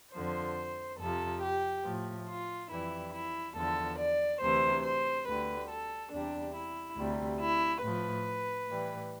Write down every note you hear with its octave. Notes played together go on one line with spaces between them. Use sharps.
F2 D3 F3 C5
F2 C3 F3 A4
G4
A2 F3
F4
F2 E3 G3 E4
E4
E2 D3 F3 A4
D5
D2 C3 E3 C5
C5
D2 D3 G3 B4
A4
E2 C3 G3 D4
E4
D2 C3 G3
E4
A2 F3 B4
A2 E3 G3